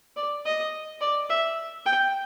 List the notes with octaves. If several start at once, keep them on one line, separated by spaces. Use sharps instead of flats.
D5
D#5
D5
E5
G5